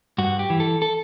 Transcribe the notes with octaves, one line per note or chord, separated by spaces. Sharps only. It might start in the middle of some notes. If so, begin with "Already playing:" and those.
G2 F#4
G4
E3
A4
A4